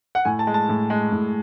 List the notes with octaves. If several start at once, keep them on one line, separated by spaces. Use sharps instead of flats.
F#5
A2 G#5
A5
G#3
A5
A2
G#3
A2